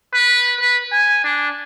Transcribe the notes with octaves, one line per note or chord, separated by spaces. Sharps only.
B4
B4
G#5
D4